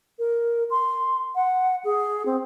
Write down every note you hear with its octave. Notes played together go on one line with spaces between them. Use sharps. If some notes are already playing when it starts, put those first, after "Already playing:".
A#4
C6
F#5
G#4
C4